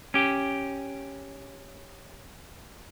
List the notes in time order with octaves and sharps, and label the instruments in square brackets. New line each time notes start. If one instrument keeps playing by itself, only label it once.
[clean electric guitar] C#4 G4